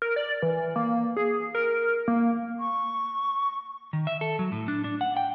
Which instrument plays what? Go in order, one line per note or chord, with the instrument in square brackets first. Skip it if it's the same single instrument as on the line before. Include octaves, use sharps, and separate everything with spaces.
[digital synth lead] A#4
D5
E3
A#3
G#4
A#4
A#3
[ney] C#6
[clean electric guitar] D#3
E5
A4
F#3
A2
D4
D4
F#5
G5